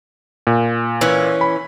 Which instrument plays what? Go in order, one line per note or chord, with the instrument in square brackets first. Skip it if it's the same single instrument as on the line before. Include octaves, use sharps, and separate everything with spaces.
[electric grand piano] A#2
[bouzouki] E3 C#4
[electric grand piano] B5